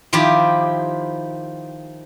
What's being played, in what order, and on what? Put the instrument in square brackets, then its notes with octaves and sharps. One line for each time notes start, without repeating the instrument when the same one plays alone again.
[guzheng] D#3 F3 E4 F4 G4